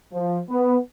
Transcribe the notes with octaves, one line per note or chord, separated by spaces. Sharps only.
F3
B3